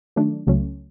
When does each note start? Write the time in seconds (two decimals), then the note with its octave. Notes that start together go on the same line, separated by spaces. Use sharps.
0.16 D#3 F#3 A3 D4
0.47 C#2 C#3 F#3 A3 C#4